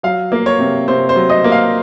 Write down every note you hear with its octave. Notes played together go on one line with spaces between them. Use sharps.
F#3 F5
A#3
C#5
C3
C3 C5
C5
F#3
D#5
A#3
F5